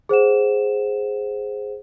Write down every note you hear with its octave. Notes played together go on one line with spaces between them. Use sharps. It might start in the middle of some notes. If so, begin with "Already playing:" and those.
G#4 C5 F#5 E7